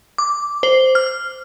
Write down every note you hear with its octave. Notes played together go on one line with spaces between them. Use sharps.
D6
C5
F6